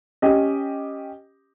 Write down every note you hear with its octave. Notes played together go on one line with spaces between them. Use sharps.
C#4 G4 D#5